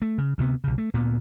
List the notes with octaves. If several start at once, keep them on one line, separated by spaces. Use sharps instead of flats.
A3
C#3
D2 C3 B3
B1 C#3
A3
D2 A#2 B3